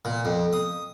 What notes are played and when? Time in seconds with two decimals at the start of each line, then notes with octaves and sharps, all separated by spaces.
0.05 A#2
0.25 F2
0.53 D#6